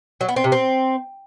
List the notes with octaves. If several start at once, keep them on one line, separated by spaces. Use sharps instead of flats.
F#3
B3
C4
C3
C4